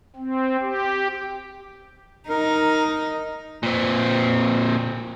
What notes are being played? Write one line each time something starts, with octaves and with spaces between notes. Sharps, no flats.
C4
G4
D#4 A#4
A#2 C4